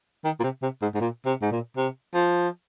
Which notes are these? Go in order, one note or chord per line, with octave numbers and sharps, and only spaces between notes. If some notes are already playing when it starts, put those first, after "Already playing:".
D#3
A#2
C3
C3
G#2
G#2
A#2
C3
G#2
A#2
C3
F3